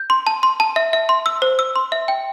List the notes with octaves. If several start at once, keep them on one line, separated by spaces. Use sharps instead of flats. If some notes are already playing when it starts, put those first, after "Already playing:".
Already playing: G6
C6
A5
C6
A5
E5
E5
C6
E6
C5
E6
C6
E5
G5